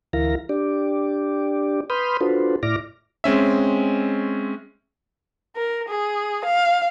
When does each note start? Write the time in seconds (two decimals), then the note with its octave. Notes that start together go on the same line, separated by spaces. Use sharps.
0.13 D2 E3 E4 A#4 F5 A#6
0.49 D4 G4 D5
1.90 B4 B5 C6 D#6 F6 G6
2.21 D4 F4 F#4 A4 B4 C5
2.63 A2 E4 D5 D6 F6 A#6
3.24 G#3 C4 C#4 E5
5.56 A#4
5.89 G#4
6.45 F5